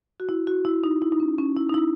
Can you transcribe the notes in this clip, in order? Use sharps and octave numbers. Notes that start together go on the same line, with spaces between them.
F#4
E4
F#4
E4
D#4
E4
D#4
C#4
C#4
E4
D#4
E4